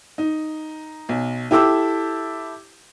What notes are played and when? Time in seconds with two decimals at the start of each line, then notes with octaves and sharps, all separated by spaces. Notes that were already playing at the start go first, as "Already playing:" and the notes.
0.18 D#4
1.09 B1
1.51 E4 G4 A4 D6 E6